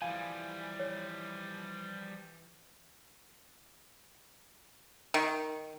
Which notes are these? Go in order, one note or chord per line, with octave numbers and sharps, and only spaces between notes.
E3 F3 G3 F5 G#5
C#5
D#3